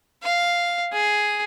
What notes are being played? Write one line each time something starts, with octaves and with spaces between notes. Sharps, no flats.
F5
G#4